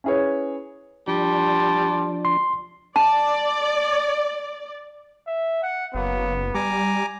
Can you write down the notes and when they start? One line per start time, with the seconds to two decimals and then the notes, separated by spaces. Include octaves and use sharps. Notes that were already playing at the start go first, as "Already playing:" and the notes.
0.04 C#4 E4 G#4 B4 C#5
1.08 F3 G3 D4 A5 C6
2.25 C6
2.96 D5 A5
5.27 E5
5.63 F#5
5.95 F#1 F#3 A#3 B3
6.54 G3 G#5 A#5 D6